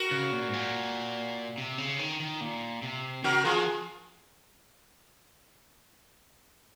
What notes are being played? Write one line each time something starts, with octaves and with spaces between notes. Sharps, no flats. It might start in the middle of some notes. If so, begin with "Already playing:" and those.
Already playing: F#4 A#4
C#3
A#2
G#2
A#2
C3
C#3
D#3
D#3
A#2
C3
C#3 F#4 A#4
F3 F4 G#4